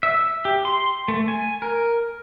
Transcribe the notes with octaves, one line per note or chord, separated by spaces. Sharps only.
E5
G4
C6
A3
G#5
A#4